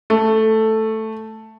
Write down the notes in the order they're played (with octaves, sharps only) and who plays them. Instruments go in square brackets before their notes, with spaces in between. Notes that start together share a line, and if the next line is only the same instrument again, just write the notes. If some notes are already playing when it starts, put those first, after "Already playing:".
[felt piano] A3